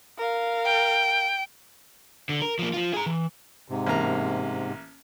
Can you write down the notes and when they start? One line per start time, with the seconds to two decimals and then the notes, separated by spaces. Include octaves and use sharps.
0.18 A#4 F5
0.66 G5
2.29 D3
2.42 A#4
2.59 F3 A#3
2.74 F3 F4
2.94 G#4 A#5
3.06 E3
3.68 G#2 C3
3.86 A1 A#3 A#5